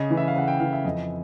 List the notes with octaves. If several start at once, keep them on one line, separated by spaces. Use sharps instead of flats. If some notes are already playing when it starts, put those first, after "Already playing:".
Already playing: C#3 D#5
E3
E5
F5
C#3 F#5
G5
E3 F5
E5
F2 D#5